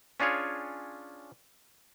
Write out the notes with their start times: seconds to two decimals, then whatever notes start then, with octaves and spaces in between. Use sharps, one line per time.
0.20 C#4 D4 F4 G#4 C#5